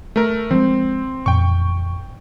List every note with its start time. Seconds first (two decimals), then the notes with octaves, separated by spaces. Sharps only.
0.16 A3 A#4
0.51 F3 G3 G#3 C4
1.26 A1 F2 A#2 G5 C#6